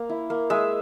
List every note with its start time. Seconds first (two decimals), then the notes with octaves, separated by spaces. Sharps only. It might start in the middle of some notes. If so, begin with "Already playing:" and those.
Already playing: A#3
0.09 E4
0.30 A#3
0.50 G#3 E5